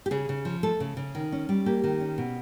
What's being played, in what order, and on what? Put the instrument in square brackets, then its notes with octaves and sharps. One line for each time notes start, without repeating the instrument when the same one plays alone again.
[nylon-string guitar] G4
C#3 G#4
C#3
F3
A3 A4
C#3
C#3
D#3
C#4
G3
A#3 G4
D#3
C#4
B2